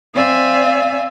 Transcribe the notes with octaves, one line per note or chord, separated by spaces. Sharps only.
C4 D5 E5 F5 G#5